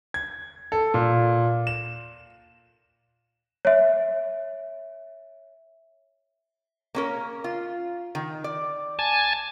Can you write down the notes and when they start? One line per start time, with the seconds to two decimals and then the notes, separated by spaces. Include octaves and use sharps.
0.14 G#6
0.72 A4
0.94 A#2
1.67 E7
3.65 C#5 E5
6.95 A#3 C#4 A#4
7.44 F4
8.15 D#3
8.44 D5
8.99 G#5 A5